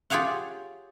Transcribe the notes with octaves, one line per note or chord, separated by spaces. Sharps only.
F4 G4 G#4 C#5 F5 F#5